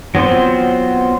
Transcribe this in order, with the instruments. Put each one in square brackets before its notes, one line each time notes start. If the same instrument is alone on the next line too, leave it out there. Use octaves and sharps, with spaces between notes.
[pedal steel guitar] F#3 B3 C4 F4 C5